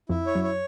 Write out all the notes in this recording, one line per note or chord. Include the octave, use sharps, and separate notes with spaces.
F2 F3 E4
C#5
F#2 F#3
C#5